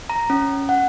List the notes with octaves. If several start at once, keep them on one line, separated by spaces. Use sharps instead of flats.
A#5
C#4
F#5